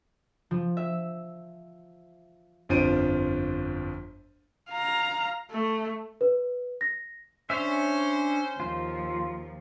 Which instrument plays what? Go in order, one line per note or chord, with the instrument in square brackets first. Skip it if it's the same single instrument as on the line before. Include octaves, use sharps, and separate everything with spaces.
[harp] F3
E5
[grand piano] G1 F2 F4 C5 D7 D#7
[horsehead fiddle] F5 A#5
A3
[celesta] B4
A#6
[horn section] C#4 C5 [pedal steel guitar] D4 C#5 E5
[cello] D#2 F3 [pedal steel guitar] F4